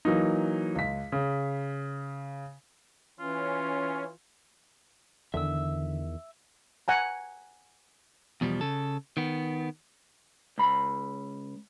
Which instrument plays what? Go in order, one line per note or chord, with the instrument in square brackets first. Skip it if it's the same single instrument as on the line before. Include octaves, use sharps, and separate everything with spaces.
[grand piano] E3 F#3 A#3 D#4
C#2 B6
C#3
[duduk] E3 [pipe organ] C#4 [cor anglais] F4
[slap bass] E2 D#3 [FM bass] D3 [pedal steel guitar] E5 E6
[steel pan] F#5 G#5 A#5
[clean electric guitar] E2 B2 F3 G3
C#3 A4
D#3 B3
C#2 B5